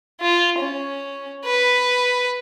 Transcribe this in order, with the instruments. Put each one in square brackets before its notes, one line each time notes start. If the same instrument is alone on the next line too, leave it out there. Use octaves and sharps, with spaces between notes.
[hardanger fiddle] F4
C#4
B4